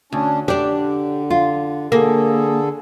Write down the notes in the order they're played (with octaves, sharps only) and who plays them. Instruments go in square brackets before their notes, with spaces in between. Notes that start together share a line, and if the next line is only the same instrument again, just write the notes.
[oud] D2 [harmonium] C#4 D4
[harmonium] D3 [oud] D4 [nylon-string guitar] G4 D5
[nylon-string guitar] F4
[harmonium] D3 G#4 A4 [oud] A#3